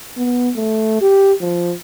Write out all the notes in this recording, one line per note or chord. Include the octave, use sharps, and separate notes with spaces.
B3
A3
G4
F3